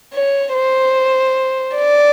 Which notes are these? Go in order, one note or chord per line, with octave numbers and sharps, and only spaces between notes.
C#5
C5
D5